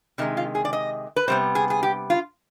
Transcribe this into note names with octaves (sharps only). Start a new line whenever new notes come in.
C3 D#3 G#3 D#4
F4
G#4
D5
D#5
B4
C3 G3 B3 C5
G#4
G#4
G4
F4